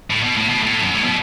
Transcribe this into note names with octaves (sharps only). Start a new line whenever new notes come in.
A2
B2
A2
B2
A2
F#2
A2
B2